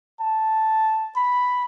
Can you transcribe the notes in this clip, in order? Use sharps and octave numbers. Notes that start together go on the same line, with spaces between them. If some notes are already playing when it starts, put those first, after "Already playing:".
A5
B5